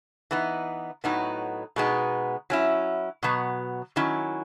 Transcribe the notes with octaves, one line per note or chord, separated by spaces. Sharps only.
E3 B3 D#4
A2 F#3 B3 D#4
B2 G#3 B3 D#4
F#3 C#4 E4
B2 F#3 B3
D#3 F#3 C#4 E4